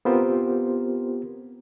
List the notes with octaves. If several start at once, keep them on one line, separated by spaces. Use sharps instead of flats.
B3 C4 F4 G4 A#4 C5